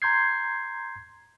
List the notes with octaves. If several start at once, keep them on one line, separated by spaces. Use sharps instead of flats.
A#5 C6 G6 G#6 C7